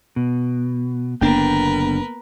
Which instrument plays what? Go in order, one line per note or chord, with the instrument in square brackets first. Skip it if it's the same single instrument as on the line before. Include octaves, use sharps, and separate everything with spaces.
[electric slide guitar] B2
[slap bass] F#1 D3 D4 [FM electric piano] A#3 B3 [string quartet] A#4 B4 [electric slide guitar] G5